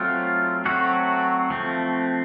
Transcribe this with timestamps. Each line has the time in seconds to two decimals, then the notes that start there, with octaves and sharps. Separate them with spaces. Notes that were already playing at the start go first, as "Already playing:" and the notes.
Already playing: F#3 A3 C4 F4
0.66 F#3 A3 C4 F#4
1.50 F3 A3 C4